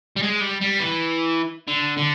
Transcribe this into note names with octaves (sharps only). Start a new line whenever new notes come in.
G3
G#3
G3
G3
E3
D3
D3